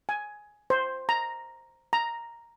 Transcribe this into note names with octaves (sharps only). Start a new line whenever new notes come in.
G#5
C5
A#5
A#5